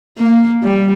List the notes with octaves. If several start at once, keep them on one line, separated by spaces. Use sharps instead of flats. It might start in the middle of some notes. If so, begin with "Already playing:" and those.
A#3
G3